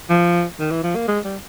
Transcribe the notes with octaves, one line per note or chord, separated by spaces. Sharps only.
F3
D#3
E3
F3
A#3
G#3
G3